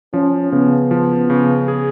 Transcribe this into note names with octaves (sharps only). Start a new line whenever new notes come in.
F3 C#4
C#3 B3
F3
C#3
G#4